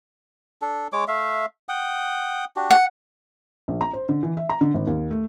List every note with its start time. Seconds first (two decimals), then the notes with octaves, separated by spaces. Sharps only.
0.62 D4 A4
0.93 G#3 C#5 D6
1.08 A3 E5 F5
1.69 F#5 G5 D#6
2.56 D4 F#4 G4
2.71 F#5
3.68 A#1
3.81 A#5
3.93 C5
4.09 D3
4.23 E3
4.37 E5
4.49 A#5
4.61 D3
4.74 G#1
4.87 D#2
5.11 A3